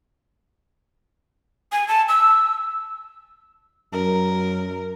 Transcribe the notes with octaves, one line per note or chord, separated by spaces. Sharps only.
G#5
A5
E6
F#2 A#4